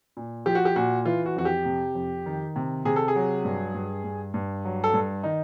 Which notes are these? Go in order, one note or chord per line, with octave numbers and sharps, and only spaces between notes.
A#2
F3 G4
F#4
G4
A#2 F#4
E3 F4
F#4
F2 F#4
G4
C3
F2
D#3
C3
C3 G#4
A4
G#4
F#3
G2
G2
G2
G2
F#3
A4
G2
D#3 D#4